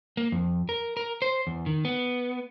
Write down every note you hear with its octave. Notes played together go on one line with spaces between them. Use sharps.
A#3
F2
A#4
A#4
C5
E2
D#3
B3